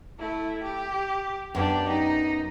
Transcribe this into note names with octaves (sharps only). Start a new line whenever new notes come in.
A3 E4
G4
F#2 B3 D4 G4
D#4